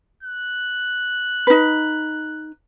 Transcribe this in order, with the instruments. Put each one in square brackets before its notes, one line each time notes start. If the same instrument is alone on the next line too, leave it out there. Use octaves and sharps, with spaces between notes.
[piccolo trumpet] F#6
[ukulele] D#4 B4